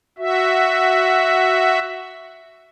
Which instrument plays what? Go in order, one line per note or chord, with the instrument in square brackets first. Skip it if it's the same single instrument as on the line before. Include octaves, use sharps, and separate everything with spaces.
[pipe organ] F#4 E5